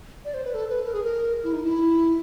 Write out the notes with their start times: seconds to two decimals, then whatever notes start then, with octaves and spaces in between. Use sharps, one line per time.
0.25 D5
0.34 C5
0.45 B4
0.54 A4
0.69 B4
0.85 A#4
0.93 G#4
1.04 A#4
1.44 E4
1.53 D#4
1.64 E4